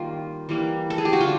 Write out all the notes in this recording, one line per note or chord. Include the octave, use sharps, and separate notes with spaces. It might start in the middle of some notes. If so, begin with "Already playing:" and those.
Already playing: D#3 G3 A#3 F4
E3 G3 A#3
A4
G#4
G4
F#4
D3 G3 F4